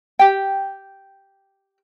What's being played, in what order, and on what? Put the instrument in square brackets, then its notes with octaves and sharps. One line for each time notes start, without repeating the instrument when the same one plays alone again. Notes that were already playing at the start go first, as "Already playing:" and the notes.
[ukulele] G4 G5